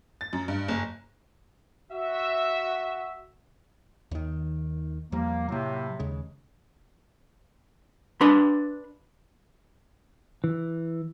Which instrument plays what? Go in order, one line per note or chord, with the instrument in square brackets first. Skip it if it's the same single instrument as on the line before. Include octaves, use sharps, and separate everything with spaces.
[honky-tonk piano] A6
F#2
G2
F#1
[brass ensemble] F#4 E5
[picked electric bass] D#2 D#3
[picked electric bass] E2 F3 G3 [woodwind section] A#3
[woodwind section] A2 C3 [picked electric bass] F#3 A#3
[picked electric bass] D#2 C#3 G#3
[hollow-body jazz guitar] D4 B4 B5 C6
[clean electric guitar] E3